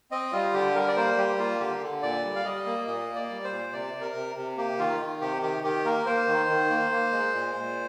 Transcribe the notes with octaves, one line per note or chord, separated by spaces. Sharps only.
C4 D#5
G3 F4
D3 G4
G3 A#4
D5
A#3 C5
G3 G4
A#3 F4
D3 G4
D3
A#2 D5
G3
F5
G3 D#5
A#3
A#2 D#5
A#3
D5
G3
C5
A#2
C3 D5
C3
A#4
C3
C3
A#3 G4
D#3 F4
D#3
C3 G4
D#3 G4
D#3 G4
A#3 A#4
A#3 C5
D#3
D#3
A#3
A#3
G#3
A#2
A#2